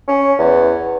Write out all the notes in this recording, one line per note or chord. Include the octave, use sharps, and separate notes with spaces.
C#4
E2